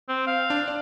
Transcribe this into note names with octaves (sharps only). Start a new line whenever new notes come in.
C4
F5
D4
D5